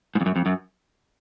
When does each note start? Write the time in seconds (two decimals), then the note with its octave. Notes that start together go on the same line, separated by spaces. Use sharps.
0.15 G#2
0.21 F2
0.26 F#2
0.36 F2
0.46 F#2